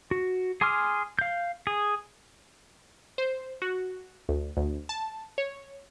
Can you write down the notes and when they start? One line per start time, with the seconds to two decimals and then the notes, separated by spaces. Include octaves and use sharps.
0.11 F#4
0.61 G#4 G#5 C6 D6 F6
1.19 F5 G6
1.67 G#4
3.18 C5
3.62 F#4
4.29 D2
4.57 D2
4.89 A5
5.38 C#5